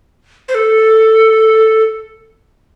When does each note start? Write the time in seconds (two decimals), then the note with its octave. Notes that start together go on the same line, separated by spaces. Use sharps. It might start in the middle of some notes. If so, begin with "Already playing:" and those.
0.48 C5
0.55 A4